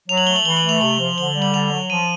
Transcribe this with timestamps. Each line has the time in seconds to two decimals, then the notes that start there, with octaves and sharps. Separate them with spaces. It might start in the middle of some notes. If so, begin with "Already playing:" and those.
0.08 F#3 F7
0.17 F#7
0.27 A3 G7
0.36 F#7
0.45 E3 G7
0.57 F#7
0.64 A3
0.69 F7
0.81 C3 F#7
0.99 F3
1.17 D3 G7
1.35 G3
1.42 F#7
1.53 D3 F7
1.72 F#3
1.89 F3 D#7